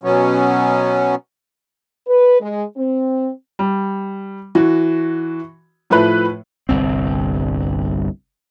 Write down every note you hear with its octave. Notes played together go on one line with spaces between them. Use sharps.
B2 F#3 B3 C#4
B4
G#3
C4
G3
E3 F#4
A2 F3 A3 B4
G1 C2 C4